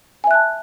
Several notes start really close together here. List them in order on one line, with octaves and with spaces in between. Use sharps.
G#5 E5 F#6 A5